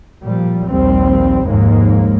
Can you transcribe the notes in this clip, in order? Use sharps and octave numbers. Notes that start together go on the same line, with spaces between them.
A#2 F3 G3
A#1 D#2 G3 C4
F1 D#2 G#2 G#3 A#3